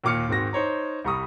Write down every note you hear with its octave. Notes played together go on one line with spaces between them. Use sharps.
D#2 A#2 D6 F6 C#7
G#2 D#3 C4 F#4 A#6
D#4 C5 C#5 A#5
C2 G3 A#5 C#6 D#6